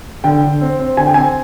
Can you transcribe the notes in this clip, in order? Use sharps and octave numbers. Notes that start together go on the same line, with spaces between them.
D3 G5
D3
C4
C4
D3 G#5
G5
C4 G#5